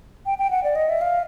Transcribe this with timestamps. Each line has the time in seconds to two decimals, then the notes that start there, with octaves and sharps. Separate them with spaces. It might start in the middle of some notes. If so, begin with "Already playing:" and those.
0.26 G5
0.38 G5
0.51 F#5
0.64 D5
0.75 D#5
0.89 E5
1.01 F5